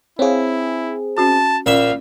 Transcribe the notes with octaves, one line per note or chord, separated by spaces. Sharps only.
C4 E4 G#4 C#5 F5
C#4 F#4 A5
A#1 C#4 E5 F5